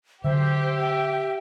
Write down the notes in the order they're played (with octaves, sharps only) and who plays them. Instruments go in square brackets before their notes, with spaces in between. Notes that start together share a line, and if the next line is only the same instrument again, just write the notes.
[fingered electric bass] D3 F#3 [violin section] G4 [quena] C5 [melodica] E5
[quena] G5